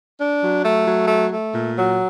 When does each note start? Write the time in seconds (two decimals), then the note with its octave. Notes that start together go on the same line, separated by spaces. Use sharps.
0.19 D4
0.42 F#3
0.64 A3
0.85 F#3
1.07 A3
1.30 A3
1.52 A#2
1.75 F#3